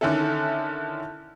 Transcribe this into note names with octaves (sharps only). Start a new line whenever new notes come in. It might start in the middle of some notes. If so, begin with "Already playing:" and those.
D3 D#3 C#4 E4 A4